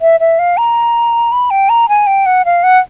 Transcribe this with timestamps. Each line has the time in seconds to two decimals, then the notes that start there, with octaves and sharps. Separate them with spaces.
0.01 E5
0.20 E5
0.39 F5
0.57 A#5
1.32 B5
1.51 G5
1.69 A#5
1.89 G#5
2.07 G5
2.26 F#5
2.45 F5
2.63 F#5